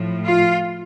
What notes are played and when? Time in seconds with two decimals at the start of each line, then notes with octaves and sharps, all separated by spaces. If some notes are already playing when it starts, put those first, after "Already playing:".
Already playing: A2 F3
0.25 F4